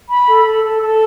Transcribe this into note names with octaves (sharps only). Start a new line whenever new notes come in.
B5
A4
A4
A4
A4